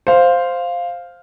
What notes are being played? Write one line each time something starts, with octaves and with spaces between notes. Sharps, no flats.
C5 F5